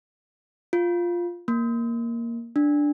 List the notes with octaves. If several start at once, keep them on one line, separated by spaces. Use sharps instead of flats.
F4
A#3
D4